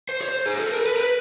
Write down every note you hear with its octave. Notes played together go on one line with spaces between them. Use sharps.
C5
C#5
C5
G#4
A4
A#4
B4
A#4
B4